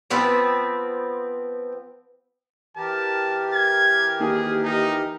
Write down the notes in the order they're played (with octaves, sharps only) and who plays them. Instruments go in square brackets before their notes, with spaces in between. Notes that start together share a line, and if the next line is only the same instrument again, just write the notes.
[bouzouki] F3 B3 C4 B4
[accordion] E3 G4 A#4 [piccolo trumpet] A5
[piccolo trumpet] G#6
[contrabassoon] D#2 [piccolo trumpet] G#4
[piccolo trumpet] D#4